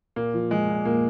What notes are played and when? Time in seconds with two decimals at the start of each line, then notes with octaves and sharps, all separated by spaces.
0.16 A#2 A#3
0.34 F3
0.51 F3 G#3
0.68 A#2
0.85 A#2 A#3